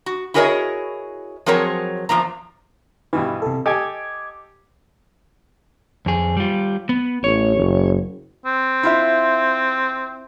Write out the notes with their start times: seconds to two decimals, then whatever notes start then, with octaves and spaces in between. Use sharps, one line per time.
0.06 F#4
0.34 E4 F#4 G#4 A#4 C#5 D#5
1.46 F3 F#3 C4 G#4 A#4 C#5
2.09 E2 F3 A#3 A#5
3.13 G2 B2 E3 B4
3.42 C3 A4
3.66 G4 A4 D#5 G#5 D6 G#6
6.06 F2 G#4
6.37 G3 F4
6.89 B3
7.24 A1 C#5
7.57 F#1
8.46 C4
8.83 E4 F4 E5